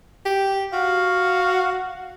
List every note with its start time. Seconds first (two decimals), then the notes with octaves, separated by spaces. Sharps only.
0.26 G4
0.73 F#4 F5